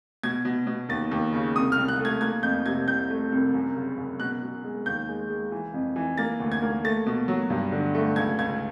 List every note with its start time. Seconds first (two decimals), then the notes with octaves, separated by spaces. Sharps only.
0.23 B2 G#6
0.45 B2
0.67 B2
0.89 D#2 A6
1.11 D#2
1.33 C#3
1.56 C2 D#6
1.72 F6
1.77 C2
1.88 F#6
1.99 A3
2.05 G#6
2.21 A#3 G#6
2.43 F2 G6
2.66 C3 G#6
2.88 C2 G6
3.10 A3
3.32 C2
3.54 F#2
3.76 C#3
3.98 F#2
4.20 B2 F#6
4.42 B2
4.64 G#3
4.86 D#2 G6
5.08 G#3
5.29 G#3
5.52 E3
5.74 F2
5.96 E3
6.18 A#3 A6
6.40 D2
6.52 G#6
6.62 A#3
6.84 A3 A6
7.06 B2
7.28 F#3
7.50 G2
7.72 D3
7.94 A3
8.16 C#2 G#6
8.39 C#2 G#6